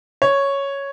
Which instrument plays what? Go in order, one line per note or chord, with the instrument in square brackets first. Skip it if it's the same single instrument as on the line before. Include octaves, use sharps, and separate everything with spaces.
[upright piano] C#5